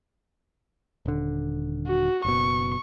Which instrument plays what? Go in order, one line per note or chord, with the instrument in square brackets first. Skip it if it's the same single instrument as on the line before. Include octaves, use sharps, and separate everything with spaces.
[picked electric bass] D#1 D3
[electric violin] F#4
[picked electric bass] F#1 B2 [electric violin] C#6